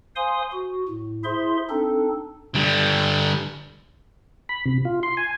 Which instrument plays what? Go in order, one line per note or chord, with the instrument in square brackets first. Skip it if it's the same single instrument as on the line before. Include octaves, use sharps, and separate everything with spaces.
[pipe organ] C5 F5 G#5 C6 D#6
F#4
A2
E4 G#4 C5 E5 C6
C4 D4 D#4 A4
[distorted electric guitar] D3 G3
[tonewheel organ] B5
C3
F4
C6
G#5